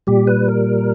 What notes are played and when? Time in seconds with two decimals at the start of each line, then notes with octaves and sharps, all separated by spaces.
0.07 A#2 G3 G4
0.27 B4
0.48 A#4